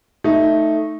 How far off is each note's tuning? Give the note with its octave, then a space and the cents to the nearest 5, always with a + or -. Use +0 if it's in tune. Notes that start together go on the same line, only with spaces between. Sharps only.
A3 +0 D#4 +0